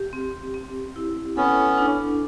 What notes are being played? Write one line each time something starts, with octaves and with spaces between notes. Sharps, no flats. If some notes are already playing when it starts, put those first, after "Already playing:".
Already playing: G4
C4
C4
E4
B3 C#4 A4
D4